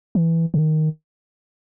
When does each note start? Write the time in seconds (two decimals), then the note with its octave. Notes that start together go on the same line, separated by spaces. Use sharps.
0.15 E3
0.54 C#3
0.59 D#3